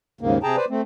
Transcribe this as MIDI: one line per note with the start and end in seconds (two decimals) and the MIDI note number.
0.21 0.38 39
0.21 0.38 44
0.21 0.38 49
0.21 0.38 58
0.43 0.56 48
0.43 0.56 68
0.43 0.56 79
0.43 0.56 81
0.43 0.56 82
0.56 0.65 71
0.56 0.65 72
0.56 0.65 74
0.70 0.81 57
0.70 0.81 60